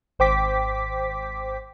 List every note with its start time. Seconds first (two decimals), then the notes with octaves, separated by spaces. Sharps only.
0.19 G#1 C5 G5 D6 B6